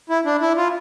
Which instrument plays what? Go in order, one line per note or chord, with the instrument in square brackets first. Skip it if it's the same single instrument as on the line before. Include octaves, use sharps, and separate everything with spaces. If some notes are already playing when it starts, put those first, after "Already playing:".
[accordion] E4
D4
E4
F4